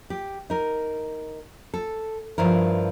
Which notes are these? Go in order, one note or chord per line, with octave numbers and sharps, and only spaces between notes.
G4
D#4 A#4
A4
G2 F3 E4 A#4